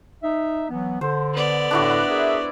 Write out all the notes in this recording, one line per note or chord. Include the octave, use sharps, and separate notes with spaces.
D#4 E5
E3 F#3 B3
D3 C5
B3 D5
A2 D3 D4 E4 F#4
G#4 A#4 E5